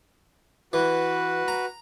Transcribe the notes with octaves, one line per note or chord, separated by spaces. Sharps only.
E3 F#4 B4
A#5